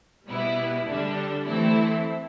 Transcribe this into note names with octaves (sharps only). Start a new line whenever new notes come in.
B2 G3 B3 E4 B4
D3 G3 D4 A4
E3 A3 C4 E4 A4